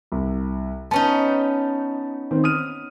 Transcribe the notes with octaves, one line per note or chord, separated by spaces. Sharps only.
C2
B3 C#4 D#4 A5
D#3 C4
D#6 F6 D#7